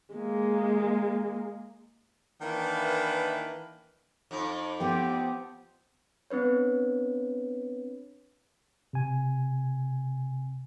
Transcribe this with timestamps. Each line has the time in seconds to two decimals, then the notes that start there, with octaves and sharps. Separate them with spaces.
0.14 G#3 A#3
2.41 D#3 E3 A#3 D4 B4
4.31 F2 D#4
4.80 F3 B3 C4 G4
6.30 B3 C4 D4 B4 C#5
8.93 C3 G#5